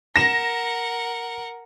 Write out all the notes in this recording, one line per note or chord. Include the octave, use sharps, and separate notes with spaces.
A#4 F#5 A#6 E7